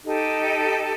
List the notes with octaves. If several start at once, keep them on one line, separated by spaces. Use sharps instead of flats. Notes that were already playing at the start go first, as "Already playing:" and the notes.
D#4 G4 A4